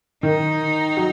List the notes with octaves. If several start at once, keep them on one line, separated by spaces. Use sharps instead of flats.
D#3 D#4
F#3